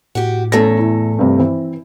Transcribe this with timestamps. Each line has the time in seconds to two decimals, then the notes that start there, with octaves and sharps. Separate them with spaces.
0.15 A2 F#4 G4
0.52 E2 A3 C#4 A4 A#6
0.79 E4
1.19 G2 C3
1.39 E3 C4